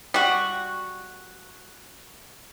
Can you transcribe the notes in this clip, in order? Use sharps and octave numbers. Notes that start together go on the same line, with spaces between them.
G3 F#4